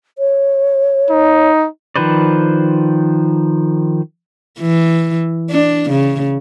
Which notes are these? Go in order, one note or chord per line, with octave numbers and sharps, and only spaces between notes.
C#5
D#4
D#3 F3 B4 C5 D5
E3
D4
C#3